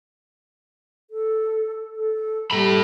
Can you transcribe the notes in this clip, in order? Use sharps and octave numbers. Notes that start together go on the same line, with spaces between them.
A4
A4
G3 A4 B5